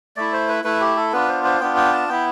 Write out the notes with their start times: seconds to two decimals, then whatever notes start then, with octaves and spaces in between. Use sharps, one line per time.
0.16 A3 E4 D5
0.32 C5
0.48 B4
0.64 A3 E4 B4
0.81 G4
0.96 A4
1.13 B3 D4 F4 B4
1.28 C5
1.44 C5
1.60 B3 D4 F4 G5
1.77 G5
1.93 A5
2.09 B3 E4 G5